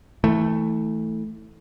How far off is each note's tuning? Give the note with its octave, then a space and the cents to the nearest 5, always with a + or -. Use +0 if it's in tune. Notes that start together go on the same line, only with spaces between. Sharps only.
E3 -25 A3 +5